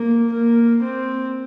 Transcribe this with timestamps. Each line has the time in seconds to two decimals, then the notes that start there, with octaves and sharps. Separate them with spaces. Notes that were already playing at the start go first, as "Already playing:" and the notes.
Already playing: A#3
0.33 A#3
0.82 C4